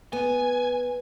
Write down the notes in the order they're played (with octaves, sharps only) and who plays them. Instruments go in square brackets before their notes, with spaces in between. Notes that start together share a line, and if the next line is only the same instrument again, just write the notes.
[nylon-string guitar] B3 [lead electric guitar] G#5